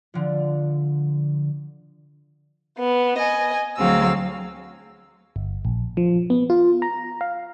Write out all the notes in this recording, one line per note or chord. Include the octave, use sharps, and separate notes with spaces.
D3 F3
B3
D#5 G#5
D2 F#3 C4 G#4 F5 E6
G1
A#1
F3
B3
F4
A#5
F5